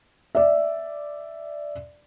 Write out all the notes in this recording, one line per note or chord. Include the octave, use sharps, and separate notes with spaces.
D5 E5